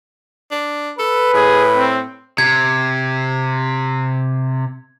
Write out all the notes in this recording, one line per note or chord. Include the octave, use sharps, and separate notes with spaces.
D4
A4 B4
A2 G#4
C4
C3 G#6